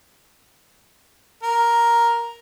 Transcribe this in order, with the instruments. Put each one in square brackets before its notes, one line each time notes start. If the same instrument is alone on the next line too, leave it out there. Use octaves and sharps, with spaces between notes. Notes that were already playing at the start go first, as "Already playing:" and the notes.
[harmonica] A#4